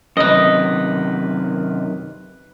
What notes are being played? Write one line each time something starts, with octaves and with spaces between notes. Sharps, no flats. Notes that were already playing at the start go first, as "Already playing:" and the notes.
F#2 C3 D#3 B4 D#5